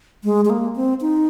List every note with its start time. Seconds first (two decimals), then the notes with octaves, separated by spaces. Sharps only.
0.24 G#3
0.45 G#3
0.50 A#3
0.76 C4
1.01 D#4